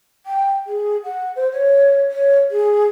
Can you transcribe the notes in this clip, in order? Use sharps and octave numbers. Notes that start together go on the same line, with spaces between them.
G5
G#4
F#5
C5
C#5
C#5
G#4